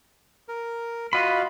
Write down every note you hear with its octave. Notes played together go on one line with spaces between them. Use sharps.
A#4
F4 F#4 D#5 F5 B5